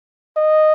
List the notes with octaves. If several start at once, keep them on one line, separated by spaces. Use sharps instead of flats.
D#5